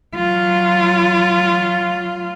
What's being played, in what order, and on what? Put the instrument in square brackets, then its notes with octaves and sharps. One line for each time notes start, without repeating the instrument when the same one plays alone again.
[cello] F#3 F4